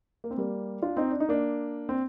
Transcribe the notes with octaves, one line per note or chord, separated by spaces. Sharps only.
A#3
C4
G3 A#3
D4 F4
C4 D#4
D4
D#4
A#3 D4
C4